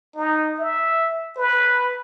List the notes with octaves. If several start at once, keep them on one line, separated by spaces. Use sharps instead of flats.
D#4
E5
B4